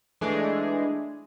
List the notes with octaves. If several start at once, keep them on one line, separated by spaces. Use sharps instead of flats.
E3 G#3 A3 D4 G#4